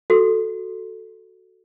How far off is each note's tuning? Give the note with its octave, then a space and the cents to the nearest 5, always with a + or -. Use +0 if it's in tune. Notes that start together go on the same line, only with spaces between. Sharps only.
F#4 +0 A4 +0